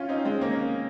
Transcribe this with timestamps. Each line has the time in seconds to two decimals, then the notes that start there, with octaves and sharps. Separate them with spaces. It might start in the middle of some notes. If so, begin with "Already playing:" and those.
Already playing: C#4 F4
0.08 C4 D#4
0.25 G#3 C4
0.41 A#3 C#4